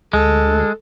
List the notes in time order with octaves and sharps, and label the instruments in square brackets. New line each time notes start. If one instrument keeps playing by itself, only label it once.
[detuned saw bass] D2 [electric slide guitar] G#3 [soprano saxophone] A4